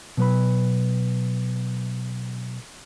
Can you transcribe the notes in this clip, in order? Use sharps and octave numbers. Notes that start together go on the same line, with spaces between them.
B2 F#3 B4 B5